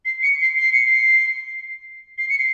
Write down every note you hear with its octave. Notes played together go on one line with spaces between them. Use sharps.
C7
C#7
C7
C7
C#7
C7
C7
C#7
C7